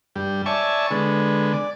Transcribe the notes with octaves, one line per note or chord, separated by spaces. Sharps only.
G2 G3
C#5 D5 E5 G#5 A5 C#6
D3 G#3 B3
D5